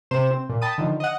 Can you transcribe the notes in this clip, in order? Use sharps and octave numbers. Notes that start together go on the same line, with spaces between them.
C3 C5 E7
C4
A#2
G5 A5 B5 D#6
D3 D#3 F3
D#5 F#5